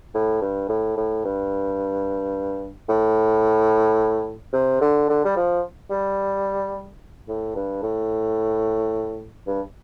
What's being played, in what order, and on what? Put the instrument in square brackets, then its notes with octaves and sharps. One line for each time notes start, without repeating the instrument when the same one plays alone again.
[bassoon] A2
G2
A2
A2
G2
A2
C3
D3
D3
G3
F3
G3
A2
G2
A2
G2